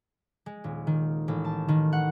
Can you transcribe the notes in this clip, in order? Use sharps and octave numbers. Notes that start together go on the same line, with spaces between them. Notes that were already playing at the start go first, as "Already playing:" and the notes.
G#3
D#1
D#3
A1
A5
D#3
F#5